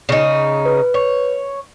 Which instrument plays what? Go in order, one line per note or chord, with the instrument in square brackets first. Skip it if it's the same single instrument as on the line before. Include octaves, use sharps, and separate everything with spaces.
[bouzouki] C#3 D#4
[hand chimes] B4
[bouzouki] C#5